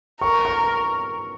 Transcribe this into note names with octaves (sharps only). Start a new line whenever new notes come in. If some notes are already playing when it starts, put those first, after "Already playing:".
A#4 C#6
C#6